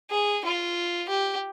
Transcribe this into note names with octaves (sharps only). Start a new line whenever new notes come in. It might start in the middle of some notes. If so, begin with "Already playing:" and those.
G#4
F4
G4